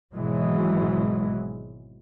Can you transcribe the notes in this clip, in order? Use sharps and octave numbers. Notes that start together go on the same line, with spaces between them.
G#1 G#2 B2 E3 F#3 G#3